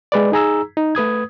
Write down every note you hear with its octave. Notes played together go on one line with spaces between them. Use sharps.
G#3 B4 D5
D#4 G#4 A#5 E6
D#4
A3 B4 D#6 G#6